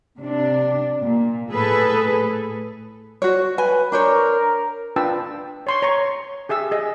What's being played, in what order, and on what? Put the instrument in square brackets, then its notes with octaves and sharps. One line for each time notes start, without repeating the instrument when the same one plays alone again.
[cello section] C3 D4
A#2
A2 G#4 A4 B4
[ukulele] F#4 C#5
[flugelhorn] B4 [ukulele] G#5
[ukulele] D4 C5 C#5 [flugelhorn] A#4
[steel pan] D4 F4 B4 G5 A5 E6
C#5 C6 C#6
C#5 A#5 C#6
G4 G#4 E5 E6
G#4 D#5